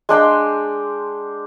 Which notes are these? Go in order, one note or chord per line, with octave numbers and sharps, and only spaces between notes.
G#3 D4 G5 C6